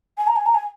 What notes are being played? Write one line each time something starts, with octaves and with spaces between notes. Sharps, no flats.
G#5
A#5
G#5
A#5
G#5